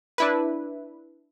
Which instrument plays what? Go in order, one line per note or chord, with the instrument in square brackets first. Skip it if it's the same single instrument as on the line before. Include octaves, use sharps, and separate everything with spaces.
[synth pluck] D4 E4 B4